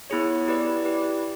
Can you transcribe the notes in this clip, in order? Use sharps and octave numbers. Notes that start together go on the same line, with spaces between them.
B3 E4 G#4 C#5
E4 G4 B4 D5
E4 G4 B4 D5